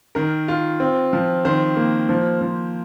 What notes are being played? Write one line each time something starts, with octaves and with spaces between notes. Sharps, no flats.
D#3 A#4
F4
C4
F3
D#3 C5
A#3
F3
F3